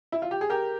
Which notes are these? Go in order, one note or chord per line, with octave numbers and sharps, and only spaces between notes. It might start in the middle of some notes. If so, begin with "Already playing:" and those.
E4
F4
G4
G#4
G4 A#4